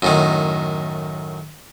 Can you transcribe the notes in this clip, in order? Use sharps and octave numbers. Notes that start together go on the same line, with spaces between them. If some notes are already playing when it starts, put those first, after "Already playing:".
F#2 A2 D#3